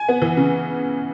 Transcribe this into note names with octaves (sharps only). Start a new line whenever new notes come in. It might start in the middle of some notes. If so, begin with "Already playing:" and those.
Already playing: G#5
B3
E3
C#3